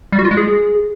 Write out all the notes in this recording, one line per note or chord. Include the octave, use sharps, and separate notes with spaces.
G3
F#4
F4
G#3
G#4